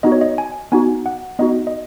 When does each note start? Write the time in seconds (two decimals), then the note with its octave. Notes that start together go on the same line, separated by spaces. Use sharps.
0.03 B3 D#4 F#4 D#5
0.12 C#5
0.21 D#5
0.38 G#5
0.72 B3 D#4 F#4 G#5
1.06 F#5
1.39 B3 D#4 F#4 D#5
1.67 D#5